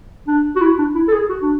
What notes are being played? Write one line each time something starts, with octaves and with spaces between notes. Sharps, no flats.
D4
F#4
E4
D4
E4
A4
G#4
F#4
D4